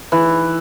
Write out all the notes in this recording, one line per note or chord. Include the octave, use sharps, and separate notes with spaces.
E3